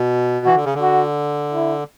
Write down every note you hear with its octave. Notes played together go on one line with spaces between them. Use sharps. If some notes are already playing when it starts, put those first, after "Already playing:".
Already playing: B2
E3 F#4
D3
C#3
D3
F#4
E4